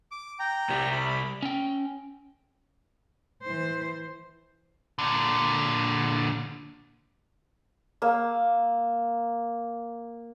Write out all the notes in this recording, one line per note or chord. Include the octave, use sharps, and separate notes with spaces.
D6
G5 A#5
C2 G3
B5
C#4 G5
E3 C5
A#2 D3
A#3 E6